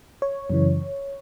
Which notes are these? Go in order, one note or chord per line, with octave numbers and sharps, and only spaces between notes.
C#5
F#2 C#3 E3